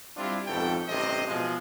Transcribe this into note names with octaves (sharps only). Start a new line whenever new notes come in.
G3 C4 D4 E4 F4
F2 G#2 B2 A4 G5
A1 G2 C3 C5 D#5
B2 F3 G#3